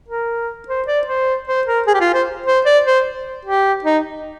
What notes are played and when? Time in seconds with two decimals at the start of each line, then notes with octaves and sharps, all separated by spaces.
0.08 A#4
0.68 C5
0.87 D5
1.07 C5
1.47 C5
1.67 A#4
1.87 G#4
1.94 G4
2.00 F4
2.14 C5
2.46 C5
2.66 D5
2.86 C5
3.45 G4
3.84 D#4